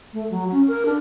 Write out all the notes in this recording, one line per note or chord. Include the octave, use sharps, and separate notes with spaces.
A3
F#3
C#4
A#4
D4